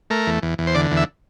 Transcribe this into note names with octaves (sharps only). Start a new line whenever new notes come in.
A3 A#4
E2
E2
E2
C5
D3 D5
E2
E5